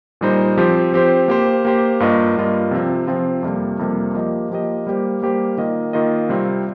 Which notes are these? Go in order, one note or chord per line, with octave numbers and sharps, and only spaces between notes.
A#2 G3 D#4 C5
F3 C4 G4 C5
F3 C4 G4 C5
A#3 G4 C5
A#3 G4 C5
G2 G3 A#3 F4 D#5
G2 G3 A#3 F4 D#5
C3 F3 C4 F4
C3 F3 C4 F4
F2 C3 G3 A#3
F2 C3 G3 A#3
F3 A#3 G4 D#5
F3 A#3 G4 D#5
G3 A#3 G4 C5
G3 A#3 G4 C5
D#3 A#3 F4 D#5
D#3 A#3 F4 D#5
C3 G3 C4 F4